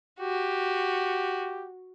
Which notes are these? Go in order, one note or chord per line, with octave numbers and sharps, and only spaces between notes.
F#4 G4